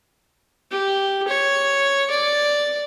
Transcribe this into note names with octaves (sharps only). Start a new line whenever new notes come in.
G4
C#5
D5